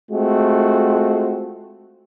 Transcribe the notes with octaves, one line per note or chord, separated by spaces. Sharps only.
G#3 A3 C4 F4 F#4